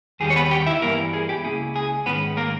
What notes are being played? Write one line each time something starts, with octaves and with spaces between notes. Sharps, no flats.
D#2 D#3 G3 G#4
C#5
B3 B4
G4 G5
E4 E5
G2 E3 G3 A#3 B3 E4 A#4
G#4
G4
C#2 B2 A#3 C#4 E4 G#4
G#4
G#2 D#3 G#3 B3 C#4 B4
A#3 A#4